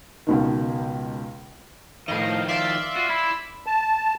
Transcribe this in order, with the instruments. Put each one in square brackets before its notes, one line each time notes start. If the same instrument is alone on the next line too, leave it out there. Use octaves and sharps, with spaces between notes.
[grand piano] C#2 B2 D#3
[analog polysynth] A2 D#5 [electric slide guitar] D#3 F3 [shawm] F5
[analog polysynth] D5 E5 C6 [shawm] F5
[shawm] F4 [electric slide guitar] F#4
[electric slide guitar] E4 [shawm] B5
[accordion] A5